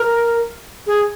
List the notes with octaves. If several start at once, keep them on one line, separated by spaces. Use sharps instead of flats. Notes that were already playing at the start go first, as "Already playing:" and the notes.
Already playing: A#4
G#4